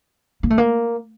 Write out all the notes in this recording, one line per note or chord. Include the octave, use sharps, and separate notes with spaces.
A#3
A3
A#3